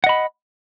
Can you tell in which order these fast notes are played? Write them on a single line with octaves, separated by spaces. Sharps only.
F#5 D#5 B5